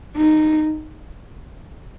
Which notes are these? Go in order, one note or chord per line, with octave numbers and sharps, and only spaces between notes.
D#4